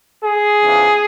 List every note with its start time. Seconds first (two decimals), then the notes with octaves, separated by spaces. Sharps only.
0.23 G#4
0.62 E2 C#3 F3